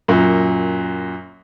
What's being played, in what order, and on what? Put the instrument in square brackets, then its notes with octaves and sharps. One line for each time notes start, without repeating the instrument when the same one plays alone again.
[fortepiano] F#2 A#2